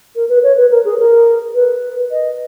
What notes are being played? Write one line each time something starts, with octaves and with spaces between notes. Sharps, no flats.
A#4
B4
C#5
B4
A#4
G#4
A#4
B4
D#5